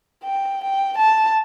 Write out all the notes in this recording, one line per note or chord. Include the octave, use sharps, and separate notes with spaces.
G5
G5
A5